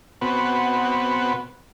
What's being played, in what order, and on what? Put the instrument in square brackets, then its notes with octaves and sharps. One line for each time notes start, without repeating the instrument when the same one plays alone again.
[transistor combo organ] B2 B3 C4 F#4